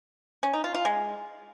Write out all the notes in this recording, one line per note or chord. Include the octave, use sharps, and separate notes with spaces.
C#4
D#4
F4
F4
G#3